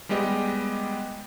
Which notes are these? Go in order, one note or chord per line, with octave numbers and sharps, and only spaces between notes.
G3 G#3 B3 G4 D#5